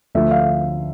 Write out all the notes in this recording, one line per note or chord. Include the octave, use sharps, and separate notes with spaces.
D2 D3 F3 E5
F5